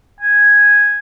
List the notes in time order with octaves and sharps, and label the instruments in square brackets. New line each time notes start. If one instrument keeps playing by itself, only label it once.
[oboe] G#5